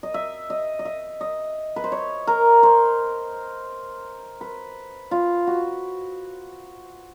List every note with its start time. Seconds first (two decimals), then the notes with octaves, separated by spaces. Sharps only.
0.03 D#5
0.14 E5
0.50 D#5
0.79 D#5
0.85 E5
1.21 D#5
1.76 B4
1.84 C5
1.92 C#5
2.27 A#4
2.63 C5
4.41 B4
5.11 F4
5.47 F#4